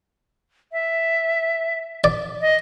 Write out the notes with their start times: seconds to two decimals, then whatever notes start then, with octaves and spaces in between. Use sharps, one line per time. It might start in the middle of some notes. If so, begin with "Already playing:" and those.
0.72 E5
2.04 D5
2.41 D#5